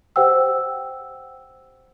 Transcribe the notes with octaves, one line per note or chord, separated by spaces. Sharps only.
G4 C5 F#5 G5 E6